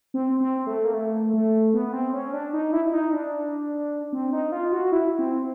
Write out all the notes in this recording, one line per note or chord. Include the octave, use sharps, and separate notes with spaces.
C4
C4
A3
A#3
A3
A3
B3
C4
C#4
D4
D#4
E4
E4
D#4
D4
C4
D#4
F4
F#4
E4
C4